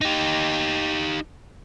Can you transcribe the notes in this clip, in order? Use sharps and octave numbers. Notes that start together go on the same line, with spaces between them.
D#4 G4